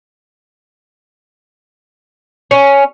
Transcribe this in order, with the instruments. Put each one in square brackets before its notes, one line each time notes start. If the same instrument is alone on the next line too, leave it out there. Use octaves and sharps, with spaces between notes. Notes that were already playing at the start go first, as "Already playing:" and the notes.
[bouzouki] C#4